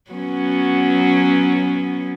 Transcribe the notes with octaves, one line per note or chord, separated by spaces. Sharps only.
F#3 B3 C#4